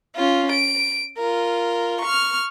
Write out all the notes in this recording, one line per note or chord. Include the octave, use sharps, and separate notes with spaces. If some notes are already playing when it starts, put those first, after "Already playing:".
C#4 F4
D7
F4 A#4
C#6 F6